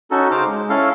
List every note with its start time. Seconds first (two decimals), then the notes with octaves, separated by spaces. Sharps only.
0.11 C#4 D#4 F#4 A4
0.31 C#3 D#4 C5 D6 F6
0.46 G#3
0.69 C#4 E4 A4 F5